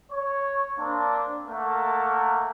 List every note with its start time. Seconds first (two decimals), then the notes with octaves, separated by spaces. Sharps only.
0.11 C#5
0.79 A#3 C4 D4
1.47 A3 A#3 A#4 F#5 A5